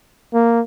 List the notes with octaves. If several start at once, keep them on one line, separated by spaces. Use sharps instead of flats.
A#3